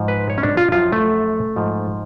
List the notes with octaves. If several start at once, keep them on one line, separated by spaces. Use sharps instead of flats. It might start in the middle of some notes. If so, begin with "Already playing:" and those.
Already playing: G#2 F3
B4
C#5
C#4
D4
F4
F#2 F3 F4
A3
G#2 F3